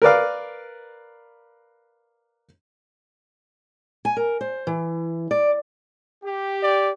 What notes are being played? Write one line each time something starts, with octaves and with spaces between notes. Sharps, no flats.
A#4 B4 D5 F5
G#5
A#4
C5
E3
D5
G4
D5